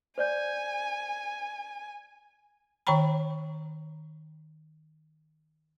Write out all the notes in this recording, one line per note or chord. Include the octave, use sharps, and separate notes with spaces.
C5 D5 G#5 G6
D#3 C#5 G5 A#5 B5